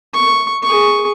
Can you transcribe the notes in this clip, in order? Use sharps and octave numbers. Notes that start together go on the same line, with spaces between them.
C#6
G#4 C#6